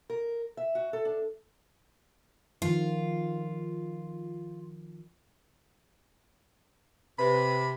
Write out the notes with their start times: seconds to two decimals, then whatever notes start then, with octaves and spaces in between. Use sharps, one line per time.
0.10 A#4
0.57 E5
0.75 F#4
0.93 A4
1.05 D4
2.62 D#3 F3 F4
7.19 C3 B4 B5